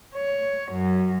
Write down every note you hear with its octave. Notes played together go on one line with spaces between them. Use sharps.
C#5
F#2